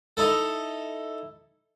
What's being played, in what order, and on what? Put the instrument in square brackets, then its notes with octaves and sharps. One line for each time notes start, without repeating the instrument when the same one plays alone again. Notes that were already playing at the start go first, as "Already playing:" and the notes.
[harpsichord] D#4 E4 A4